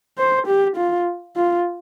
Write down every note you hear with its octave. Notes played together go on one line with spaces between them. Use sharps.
C5
G4
F4
F4